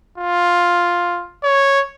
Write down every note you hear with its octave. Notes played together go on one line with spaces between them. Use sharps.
F4
C#5